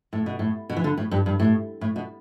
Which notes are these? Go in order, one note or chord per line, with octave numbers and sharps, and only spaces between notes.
A2
B2
A2
B2
E3
D3
A2
G2
G2
A2
A2
B2